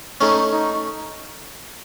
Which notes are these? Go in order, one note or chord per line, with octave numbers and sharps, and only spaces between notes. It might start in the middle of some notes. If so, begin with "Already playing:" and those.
A3 C#4 D#4
D#4